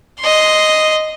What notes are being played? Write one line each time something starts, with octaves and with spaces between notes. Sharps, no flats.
D#5 C6